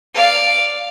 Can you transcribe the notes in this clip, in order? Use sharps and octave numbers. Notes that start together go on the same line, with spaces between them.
D5 F5